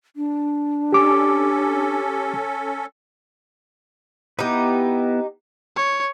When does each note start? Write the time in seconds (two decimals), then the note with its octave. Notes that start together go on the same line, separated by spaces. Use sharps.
0.16 D4
0.93 C#4 G4 A4 D6
4.39 B3 D#4 E4 G4 B4
5.76 C#5